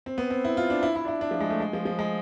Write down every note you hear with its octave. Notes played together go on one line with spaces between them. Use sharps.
C4
B3
C4
E4
F4
D4
E4
E4
D4
E4
D4
F3
G#3
A3
G#3
F3
F3
G#3